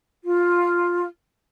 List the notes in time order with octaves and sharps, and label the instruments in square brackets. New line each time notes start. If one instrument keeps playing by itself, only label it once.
[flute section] F4